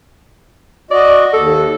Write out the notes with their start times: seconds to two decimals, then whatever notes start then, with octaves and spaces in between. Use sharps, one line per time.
0.91 F#4 D5 D#5
1.33 D#2 A4